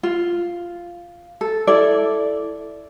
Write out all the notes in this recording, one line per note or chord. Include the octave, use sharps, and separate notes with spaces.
F4
A4
E4 A4 D5